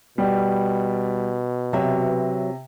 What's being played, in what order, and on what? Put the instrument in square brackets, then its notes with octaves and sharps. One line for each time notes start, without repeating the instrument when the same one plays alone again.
[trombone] B2 [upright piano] G3
[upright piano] C3 [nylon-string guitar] F#3 B4 E5